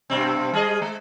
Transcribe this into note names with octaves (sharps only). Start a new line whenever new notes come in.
G2 B2 C4
G3 G#4 D#5
G#3